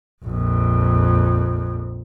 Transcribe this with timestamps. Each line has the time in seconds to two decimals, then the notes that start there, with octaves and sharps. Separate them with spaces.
0.24 A#1 F2